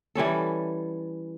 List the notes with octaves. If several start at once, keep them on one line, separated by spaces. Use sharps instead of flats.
E3 G3 C#4 A4